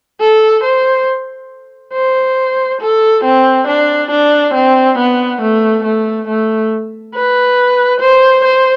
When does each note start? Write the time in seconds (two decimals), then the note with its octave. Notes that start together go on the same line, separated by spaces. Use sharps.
0.20 A4
0.64 C5
1.93 C5
2.81 A4
3.24 C4
3.67 D4
4.11 D4
4.54 C4
4.98 B3
5.41 A3
5.84 A3
6.28 A3
7.14 B4
8.01 C5
8.44 C5